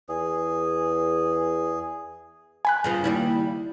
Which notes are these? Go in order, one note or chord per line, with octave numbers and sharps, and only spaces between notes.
E2 G#4
G#5 B5 F#6
G2 C#3 F3
D#2 G3 E4